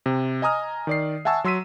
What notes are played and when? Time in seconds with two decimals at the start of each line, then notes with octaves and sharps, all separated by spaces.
0.06 C3
0.42 D#5 G#5 A#5 D#6 F6
0.87 D#3 D5 C7
1.25 E5 F#5 G#5 A5 C#6 E6
1.44 F#3 C6 E6 B6 D#7